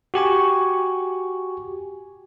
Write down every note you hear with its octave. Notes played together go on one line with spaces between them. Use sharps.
F#4 G4 G#5 C#6